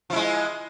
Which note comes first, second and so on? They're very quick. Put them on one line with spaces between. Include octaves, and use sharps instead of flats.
F3 E4 G#3